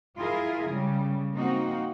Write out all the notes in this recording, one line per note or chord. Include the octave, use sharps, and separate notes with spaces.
E4 F4 G#4 A#4
C#3 G3
A#3 C4 D#4 F#4